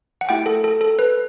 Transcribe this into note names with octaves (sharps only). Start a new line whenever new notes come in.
F#5
A3 E4 G4 G5
A4
A4
A4
B4